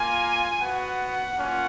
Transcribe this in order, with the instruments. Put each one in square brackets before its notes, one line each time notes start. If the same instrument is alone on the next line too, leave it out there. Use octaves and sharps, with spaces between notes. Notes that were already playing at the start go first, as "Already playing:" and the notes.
Already playing: [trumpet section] A#3 F4 G#5
B3 F#4 F#5
A#3 C#4 F4 F#5